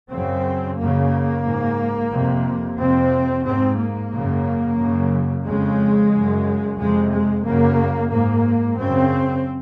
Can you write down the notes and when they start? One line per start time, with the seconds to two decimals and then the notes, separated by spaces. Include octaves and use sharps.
0.12 F#2 C#3 C4
0.78 F#2 C#3 A#3
1.45 G#2
2.12 F2 C3
2.78 F2 C3 C4
3.45 G#2 C4
3.78 A#3
4.11 F#2 C#3
4.78 F#2 C#3
5.45 F2 C#3 G#3
6.11 F#2 C#3
6.77 F2 C3 G#3
7.11 G#3
7.44 F#2 C#3 A#3
8.10 G#2 A#3
8.77 F#2 C#3 C4